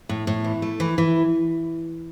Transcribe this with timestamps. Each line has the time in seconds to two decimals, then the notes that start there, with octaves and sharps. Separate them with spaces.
0.09 A2
0.27 A2
0.44 E3
0.62 A3
0.80 E3
0.98 E3